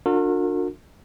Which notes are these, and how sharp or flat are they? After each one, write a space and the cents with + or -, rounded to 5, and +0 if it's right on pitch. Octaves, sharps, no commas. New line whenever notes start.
D4 +10 F#4 -45 A#4 -40